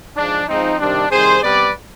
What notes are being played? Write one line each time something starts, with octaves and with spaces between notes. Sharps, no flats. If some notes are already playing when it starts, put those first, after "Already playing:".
G#2 F3 G#3 D4
G#2 F3 G#3 C4 D#4
C3 D#3 G3 C4 D4
C3 D#3 G3 G#4 C5
C3 G3 B3 B4 D5